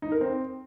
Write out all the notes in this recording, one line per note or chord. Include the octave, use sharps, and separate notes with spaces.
D#4
A#4
C4